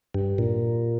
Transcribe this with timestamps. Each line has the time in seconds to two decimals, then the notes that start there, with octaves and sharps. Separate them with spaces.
0.14 G2
0.38 A#2